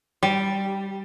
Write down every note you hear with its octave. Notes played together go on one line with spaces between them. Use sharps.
G3